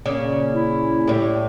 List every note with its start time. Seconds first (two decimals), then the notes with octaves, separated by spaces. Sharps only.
0.06 A#2 C#3 A#3 C#4 D5
0.52 E4
1.08 A2 G3